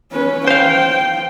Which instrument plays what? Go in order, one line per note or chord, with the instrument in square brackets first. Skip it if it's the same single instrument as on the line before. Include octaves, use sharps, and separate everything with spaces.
[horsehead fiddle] C#4 B4
[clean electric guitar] C5 F5 [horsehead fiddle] G5